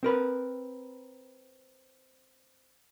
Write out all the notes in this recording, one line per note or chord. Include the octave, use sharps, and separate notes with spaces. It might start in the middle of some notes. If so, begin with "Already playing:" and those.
C4 A#4 B4